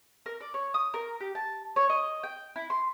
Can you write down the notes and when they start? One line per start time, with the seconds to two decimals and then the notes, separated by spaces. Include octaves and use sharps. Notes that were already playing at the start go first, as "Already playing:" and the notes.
0.26 A#4
0.41 D5
0.54 C#5
0.74 D#6
0.94 A#4
1.20 G4
1.35 A5
1.76 C#5
1.90 D#5
2.23 G5
2.56 E4
2.70 C6